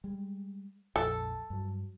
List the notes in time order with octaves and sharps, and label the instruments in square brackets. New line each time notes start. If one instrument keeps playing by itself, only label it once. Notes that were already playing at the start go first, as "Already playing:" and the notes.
[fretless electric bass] G3 G#3
[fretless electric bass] A#1 F2 [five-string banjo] A4
[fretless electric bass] G2 F#3